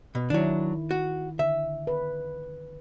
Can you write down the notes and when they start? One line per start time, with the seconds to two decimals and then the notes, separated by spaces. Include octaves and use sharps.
0.15 B2
0.30 D#3 F#3 D4 E4
0.91 F#4
1.39 D3 E5
1.87 B4